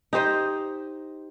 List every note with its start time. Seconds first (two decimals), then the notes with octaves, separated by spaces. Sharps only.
0.13 D#4 G4 C5 D#5